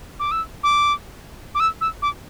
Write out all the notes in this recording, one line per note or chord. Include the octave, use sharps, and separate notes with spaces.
D6
E6
D6
D6
E6
E6
D6